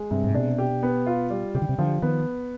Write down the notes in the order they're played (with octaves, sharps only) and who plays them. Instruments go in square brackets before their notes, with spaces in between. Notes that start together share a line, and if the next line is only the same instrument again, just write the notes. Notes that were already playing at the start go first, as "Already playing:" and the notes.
Already playing: [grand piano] G#3
[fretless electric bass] G2 [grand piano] C3
[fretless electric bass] G#2
[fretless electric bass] B2 [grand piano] D4
[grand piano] G4
B3
F4
G3
[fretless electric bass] C3 [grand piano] G4
[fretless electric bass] D3
C3
[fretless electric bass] D3 [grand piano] F3
[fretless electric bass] D#3 [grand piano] B3